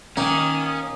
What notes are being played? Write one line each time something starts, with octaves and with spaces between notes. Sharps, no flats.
D#3 A#3 C#4 D#4 G#5 D#6